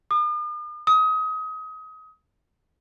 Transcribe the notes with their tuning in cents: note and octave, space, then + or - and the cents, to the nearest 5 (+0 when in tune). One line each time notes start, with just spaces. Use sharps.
D#6 -45
D#6 +25